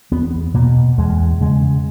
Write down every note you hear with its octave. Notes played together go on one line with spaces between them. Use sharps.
E2 B3
B2 A#3
E2 G#3
C#3 G#3